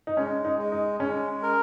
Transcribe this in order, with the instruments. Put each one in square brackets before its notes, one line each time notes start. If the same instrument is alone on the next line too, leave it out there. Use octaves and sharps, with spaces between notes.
[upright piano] D#4
[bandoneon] G#3 [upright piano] C#4
[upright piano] D#4
[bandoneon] G#3
[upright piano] D#4
[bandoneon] G#3 [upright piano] C#4
[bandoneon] A#4